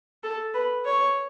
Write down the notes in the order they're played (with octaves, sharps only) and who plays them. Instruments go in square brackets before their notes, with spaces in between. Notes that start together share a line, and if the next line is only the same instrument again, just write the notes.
[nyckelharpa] A4
B4
C#5